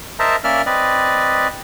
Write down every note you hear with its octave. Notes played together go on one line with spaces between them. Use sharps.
A#4 C5 D#5 E5 A5 A#5
A#3 C#4 A#4 D5 E5 F6
C4 B4 D5 D#5